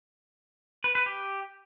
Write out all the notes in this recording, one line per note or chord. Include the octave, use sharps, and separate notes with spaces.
B4
B4
G4